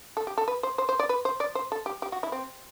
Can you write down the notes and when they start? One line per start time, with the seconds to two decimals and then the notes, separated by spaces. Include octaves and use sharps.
0.17 A4
0.27 G4
0.37 A4
0.48 B4
0.63 C5
0.78 C5
0.89 C5
0.99 D5
1.09 B4
1.25 C5
1.40 D5
1.55 C5
1.72 A4
1.86 G4
2.02 G4
2.12 F#4
2.23 E4
2.32 C4